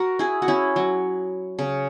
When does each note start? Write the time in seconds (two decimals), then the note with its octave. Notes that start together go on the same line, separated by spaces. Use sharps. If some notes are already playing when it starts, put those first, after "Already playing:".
Already playing: F#4 A#4
0.19 E4 G#4
0.42 F#4
0.48 C#4 E4
0.76 F#3
1.59 C#3